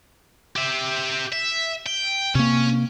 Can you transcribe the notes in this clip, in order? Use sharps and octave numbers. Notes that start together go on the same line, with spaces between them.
G4 E5
E5
G5
C3 A#3 C#4